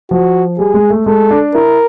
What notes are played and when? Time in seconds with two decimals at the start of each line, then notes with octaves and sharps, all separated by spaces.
0.10 F3 F#4
0.58 G3 G#4
0.74 G#3
0.90 A3
1.06 G#3 A4
1.31 D4
1.54 E4 A#4